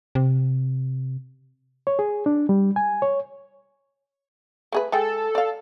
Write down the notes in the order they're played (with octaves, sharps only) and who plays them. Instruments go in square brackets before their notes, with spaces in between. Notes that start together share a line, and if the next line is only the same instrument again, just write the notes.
[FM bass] C3
[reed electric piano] C#5
G#4
D4
G3
G#5
C#5
[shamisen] A3 G#4 B4
[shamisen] G#3 G#4 G5 [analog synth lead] A4
[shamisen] D5 F5